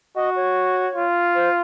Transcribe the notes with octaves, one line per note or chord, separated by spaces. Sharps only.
F#4 D#5
C#5
F4
C5